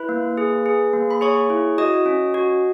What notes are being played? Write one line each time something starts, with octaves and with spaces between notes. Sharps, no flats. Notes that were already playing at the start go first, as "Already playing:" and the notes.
Already playing: E4 B4 B5
A#3
G#4
G#4
A#3
B5
G#4 C#5 C#6
E4
F#4 D#5 D#6
C#4
F#4